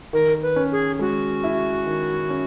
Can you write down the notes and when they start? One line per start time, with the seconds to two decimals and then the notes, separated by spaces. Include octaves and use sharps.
0.13 D#3 A#4
0.42 B4
0.56 C#4
0.72 G#4
0.99 G#3 F#4
1.44 E4
1.86 D#3
2.30 C#4